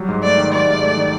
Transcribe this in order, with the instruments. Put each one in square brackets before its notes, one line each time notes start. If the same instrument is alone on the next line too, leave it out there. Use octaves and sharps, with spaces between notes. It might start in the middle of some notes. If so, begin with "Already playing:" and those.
Already playing: [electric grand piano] F#3 G3
G#2
[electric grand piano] A3 [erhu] D5
[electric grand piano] D#3
[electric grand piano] F#3 [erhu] D5
[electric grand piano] G#2
A3
D#3